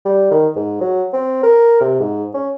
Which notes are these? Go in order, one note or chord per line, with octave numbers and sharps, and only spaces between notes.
G3
D#3
G#2
F#3
C4
A#4
C3
G#2
C#4